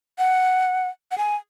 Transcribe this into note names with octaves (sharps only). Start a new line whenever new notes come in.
F#5
F#5
G#5